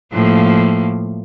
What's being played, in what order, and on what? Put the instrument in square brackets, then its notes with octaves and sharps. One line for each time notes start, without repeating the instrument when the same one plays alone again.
[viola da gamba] A2 F3 A#3